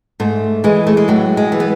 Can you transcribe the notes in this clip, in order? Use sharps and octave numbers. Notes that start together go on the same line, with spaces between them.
G#2 A3
E3 G#3
A3
G#3
A2 F#3
G#3
E3
B3